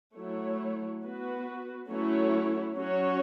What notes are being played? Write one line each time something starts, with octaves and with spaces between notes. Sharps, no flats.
F#3 A3 E4 C#5
B3 F#4 B4
F#3 A3 C#4 E4 C#5
F#3 C#4 F#4 C#5